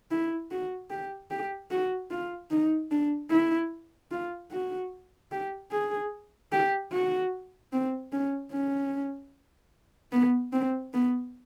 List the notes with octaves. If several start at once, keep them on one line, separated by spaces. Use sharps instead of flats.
E4
F#4
G4
G4
F#4
F4
D#4
D4
E4
F4
F#4
G4
G#4
G4
F#4
C4
C#4
C#4
B3
C4
B3